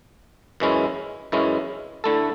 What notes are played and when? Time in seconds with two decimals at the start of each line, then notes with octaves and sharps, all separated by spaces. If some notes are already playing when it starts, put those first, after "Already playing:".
0.60 F#2 E3 G#3 C#4 E4
1.32 F#2 E3 G#3 C#4 E4
2.04 D3 A3 E4 A4